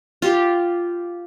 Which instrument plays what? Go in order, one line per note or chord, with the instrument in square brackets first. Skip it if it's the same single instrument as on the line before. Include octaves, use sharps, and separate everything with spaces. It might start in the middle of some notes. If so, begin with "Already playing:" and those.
[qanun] F4 G4